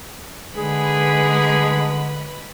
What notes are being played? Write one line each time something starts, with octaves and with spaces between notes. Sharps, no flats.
D3 G#3 D4 D#4 G#4 B4 B5